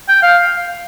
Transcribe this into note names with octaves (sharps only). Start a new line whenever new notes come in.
G5
F5